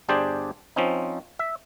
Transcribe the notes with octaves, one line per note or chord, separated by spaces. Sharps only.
G1 D4 G4 G#4 C5 D5
F3 C4 C#4 D#4
E5